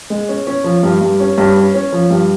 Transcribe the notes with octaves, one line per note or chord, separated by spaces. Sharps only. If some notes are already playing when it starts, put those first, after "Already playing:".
G#3
C#4
C#4
F3
G2
G2
C#4
G2
C#4
C#4
F3
G2